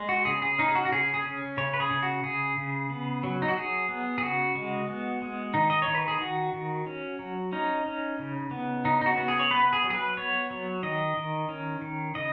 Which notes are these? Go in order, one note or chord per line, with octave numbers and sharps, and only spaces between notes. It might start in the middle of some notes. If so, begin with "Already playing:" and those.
Already playing: G#3
F#4
C#3 G#4
G#4
C#4 D#4
G#4
F#4
F#4
C#3 G#4
G#4
C#4
C#3 C#5
B4
G#4
C#3
F#4
C#3 G#4
C#3
B3
F#3
D#4
F#4
F#3 G#4
B3
G#4
C#3 F#4
G#3
B3
G#3
D#3 D#4
D#5
C#5
D#3
B4
G#4
D#3 F#4
D#3
C#4
F#3
C#4 D#4
C#4
C#3
B3
C#3 D#4
D#4
F#4
B3
G#4
C#5
B3 B4
G#4
F#3
G#4
B4
B3 C#5
F#3
D#3 D#5
D#3
C#4
D#3
C#3 D#5